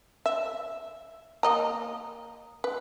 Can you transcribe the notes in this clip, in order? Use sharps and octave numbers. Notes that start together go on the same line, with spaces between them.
E5
A#3 D#5 A#5
B4